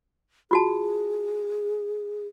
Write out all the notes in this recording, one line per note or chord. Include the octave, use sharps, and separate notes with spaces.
F4 F#4 G#4 A5